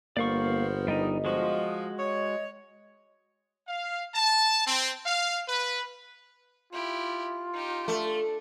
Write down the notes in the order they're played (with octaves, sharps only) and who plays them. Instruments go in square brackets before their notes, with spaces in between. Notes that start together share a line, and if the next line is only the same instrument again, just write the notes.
[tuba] G1 [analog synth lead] A#3 [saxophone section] B3 A#4 C5 [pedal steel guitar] D5 F5 C#6
[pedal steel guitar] G3 D#4 [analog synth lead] D#5
[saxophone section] F3 [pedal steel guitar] G#3 F#4
[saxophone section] C#5
[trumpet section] F5
A5
C4
F5
B4
[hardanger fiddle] E4 G4 [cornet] F4
[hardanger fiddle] D#4 G4
[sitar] A3 [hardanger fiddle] D4